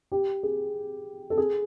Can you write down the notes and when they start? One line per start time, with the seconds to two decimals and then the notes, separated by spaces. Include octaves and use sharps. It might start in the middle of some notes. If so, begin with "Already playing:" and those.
0.12 G4
0.43 G#4
1.30 A4
1.38 G#4